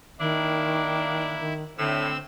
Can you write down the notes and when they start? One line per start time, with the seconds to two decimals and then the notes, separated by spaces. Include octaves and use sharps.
0.20 D#3 A#3 D4 E4
1.40 D#3
1.78 A2 D3 C4 E6